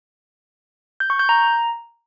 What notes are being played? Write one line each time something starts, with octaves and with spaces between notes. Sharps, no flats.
G6
C#6
G6
A#5